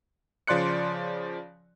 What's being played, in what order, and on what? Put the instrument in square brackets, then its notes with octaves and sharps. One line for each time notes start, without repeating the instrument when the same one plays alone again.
[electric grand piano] C#3 F3 D5 C6 F#6 C#7